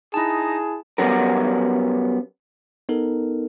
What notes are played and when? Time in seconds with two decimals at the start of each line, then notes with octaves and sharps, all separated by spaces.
0.14 D#4 E4 G#4 A5
0.98 F#3 G3 B3 C#4 A#4
2.89 B3 D#4 A4 A#4